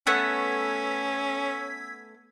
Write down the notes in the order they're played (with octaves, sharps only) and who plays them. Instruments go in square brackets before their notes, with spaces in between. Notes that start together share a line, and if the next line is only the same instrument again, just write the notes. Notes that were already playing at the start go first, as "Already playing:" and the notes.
[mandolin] A3 B3 F#5 [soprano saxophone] C#4 [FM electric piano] E6 G#6 B6